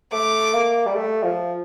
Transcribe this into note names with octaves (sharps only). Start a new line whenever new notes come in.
A3 D6
A#3
G3
A3
F3